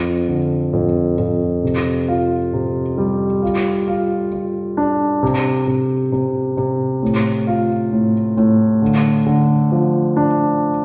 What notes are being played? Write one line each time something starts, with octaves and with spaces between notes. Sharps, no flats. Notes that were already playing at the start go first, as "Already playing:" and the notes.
Already playing: F2
D3
F2
F2
C3
F4
C3
G3
F4
F4
F4
D4
C3
C3
C3
C3
A2
F4
A2
A2
D3
D3
F3
D4